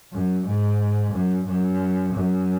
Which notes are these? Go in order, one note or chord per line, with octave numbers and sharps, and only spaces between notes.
F#2
G#2
F#2
F#2
F#2